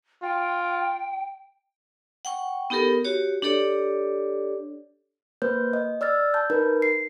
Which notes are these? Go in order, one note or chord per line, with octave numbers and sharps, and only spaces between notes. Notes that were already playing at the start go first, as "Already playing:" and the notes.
F4 G5
F#5 G5 C#6
B3 D#4 G4 A4 A#4
F#4 G4 C#5
D4 G4 A4 C#5 D5
A#3 B4 C5 G6
D#5
D5 E6 F6 A6
A5 G6
D#4 A#4 B4
C7